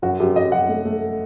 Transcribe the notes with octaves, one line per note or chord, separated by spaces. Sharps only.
F#2 F#4
F#2 G4
F#2 D#5
F#2 F#5
A3
A3